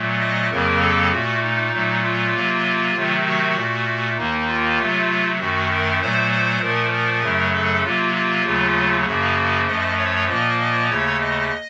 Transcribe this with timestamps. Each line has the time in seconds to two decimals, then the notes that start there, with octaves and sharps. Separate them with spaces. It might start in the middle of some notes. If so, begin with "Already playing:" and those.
Already playing: A#2 F#3 A3
0.20 D#5
0.51 F2 C#3 F#3 A#3 A#4
0.81 A4
1.11 A#2 A3 F#4
1.42 D#4
1.73 A#2 F#3 A3
2.03 F4
2.34 C3 F#3 A#3
2.95 C3 D#3 F#3 A3
3.26 F#4
3.56 A#2 A3
4.17 D#2 D#3 A#3 D#4
4.47 F4
4.78 C3 F#3 A3
5.40 F#2 D#3 A3 F#4
5.71 A#4
6.01 A#2 F#3 A3 C5
6.31 C5
6.61 A#2 F3 A3 A#4
6.92 A#4
7.23 F#2 C#3 F#3 A3
7.54 A4
7.84 C3 F#3 A#3 F4
8.14 F4
8.45 D#2 C#3 F#3 A3
9.06 F#2 C#3 F3 A#3 F#4
9.67 F#2 F3 A3 D#5
9.98 C#5
10.29 A#2 F3 A#3 D#5
10.59 D#5
10.90 D#2 C#3 A3 C#5
11.21 D#5